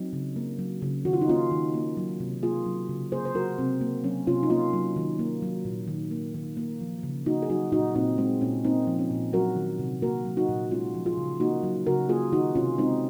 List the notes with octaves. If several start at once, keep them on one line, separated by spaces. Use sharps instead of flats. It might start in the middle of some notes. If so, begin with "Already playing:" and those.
Already playing: F#3 C4 D#4
C#3
A#3
F#3
C#3
D#3 F#4
F4
D#4
A#3 C#4 F4
D#3
A#3
F#3
C3
A#3 F4 G#4
F#3
C#3
A#3 G#4 C5
C5
F#3 F#4 A#4
C3 C4
A#3
F#3 C#4
C3 C#4 F4
D#4
A#3 C#4 F4
F#3
D#3
A#3
F#3
A#2
D#3
A#3
D#3
A#3
F3
C#3
A#3 D#4 F#4
G#4
F#3 D#4 F#4
A#2 D#4 F#4
A#2 C4 D#4
G#3 C4
A#2 C#4
A#3 C4 D#4
F3
C#4
A#2
F#3 F#4 A#4
D#3
C3
A#3 F#4 A#4
F#3
D#4 F#4
A#2
G#3 C#4 F4
F3
F4 G#4
C#3
A#3 D#4 F#4
F#3
C#3 F#4 A#4
A#3 F4 G#4
D#3 D#4 F#4
C3 C#4 F4
G#3 C4 D#4